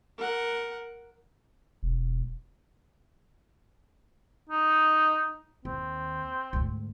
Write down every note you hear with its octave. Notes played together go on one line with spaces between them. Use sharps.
A#4 F#5
E1
D#4
D#2 C4
D2 G#2